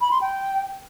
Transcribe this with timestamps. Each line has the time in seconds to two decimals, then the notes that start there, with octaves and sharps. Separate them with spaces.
0.01 B5
0.11 C6
0.21 G5